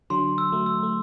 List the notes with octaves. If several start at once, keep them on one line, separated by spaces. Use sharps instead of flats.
D3 F#3 C6
E6
F#3 A3
E6
A3